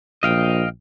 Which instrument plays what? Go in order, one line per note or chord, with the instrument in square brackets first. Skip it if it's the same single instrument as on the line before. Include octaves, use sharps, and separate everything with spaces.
[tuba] A#1 [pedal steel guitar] D#5 F5 G5